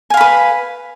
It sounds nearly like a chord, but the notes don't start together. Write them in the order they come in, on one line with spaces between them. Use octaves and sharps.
G#5 F5 B5 B4